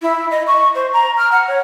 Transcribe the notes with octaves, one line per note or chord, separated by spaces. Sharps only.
E4
D#5
C#6
C5
A#5
F6
F#5
C#5